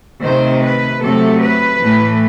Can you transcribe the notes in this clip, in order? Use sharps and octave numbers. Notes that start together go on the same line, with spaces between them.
C3 D#3 A3 C5
B4
C3 F#3 A3 A4
B4
A2 E3 A3